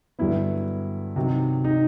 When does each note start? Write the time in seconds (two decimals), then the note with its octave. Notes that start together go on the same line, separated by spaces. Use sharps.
0.19 G2 D3 F#3 B3 E4
1.16 C3 D#3 F#3
1.64 D#4